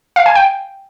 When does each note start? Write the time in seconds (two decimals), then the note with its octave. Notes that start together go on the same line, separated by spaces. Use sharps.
0.16 F5
0.26 G#5
0.35 G5